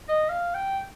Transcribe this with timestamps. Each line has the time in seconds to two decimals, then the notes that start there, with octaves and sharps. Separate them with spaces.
0.09 D#5
0.29 F5
0.54 G5